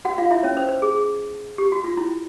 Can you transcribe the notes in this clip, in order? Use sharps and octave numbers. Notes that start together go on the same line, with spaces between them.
F#4 F#5
F4 F5
E4 E5
C#4 C#5
C5
C5
G#4
G4
F#4
F4
E4